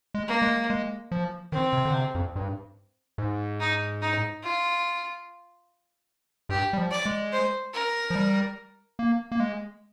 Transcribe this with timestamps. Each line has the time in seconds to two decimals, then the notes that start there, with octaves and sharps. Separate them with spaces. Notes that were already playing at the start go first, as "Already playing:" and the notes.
0.14 G#3
0.27 A#3
0.42 G#3
0.70 G#3
1.11 F3
1.52 D#3 C4
1.73 C3
1.85 D3
1.94 C3
2.15 F2
2.36 G2
3.18 G#2
3.60 D#4
4.02 D#4
4.43 F4
6.49 G2 G4
6.73 G3
6.78 F3
6.91 D5
7.06 G#3
7.33 C5
7.74 A#4
8.10 F3
8.15 G3
8.99 A#3
9.32 A#3
9.40 G#3